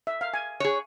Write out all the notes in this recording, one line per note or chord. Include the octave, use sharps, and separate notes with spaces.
E5
F5
G#5
G#4 C#5